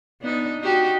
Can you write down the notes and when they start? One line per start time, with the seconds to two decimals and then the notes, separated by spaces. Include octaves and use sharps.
0.21 B3 D4 D#4
0.61 D#4 F#4 G4